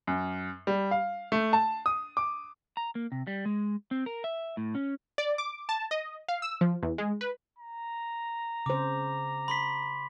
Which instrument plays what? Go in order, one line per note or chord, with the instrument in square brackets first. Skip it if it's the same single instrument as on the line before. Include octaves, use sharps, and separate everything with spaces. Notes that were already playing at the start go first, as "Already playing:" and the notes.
[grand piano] F#2
G3
F5
A3
A5
D#6
D6
[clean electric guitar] A#5
A#3
C3
G3
G#3
C4
A#4
E5
A2
C#4
[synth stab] D5
D6
A5
D#5
F5
E6
F3
E2
G#3
B4
[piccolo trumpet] A#5
[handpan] C#3 C5 [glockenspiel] D6
[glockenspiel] B5 C6 B6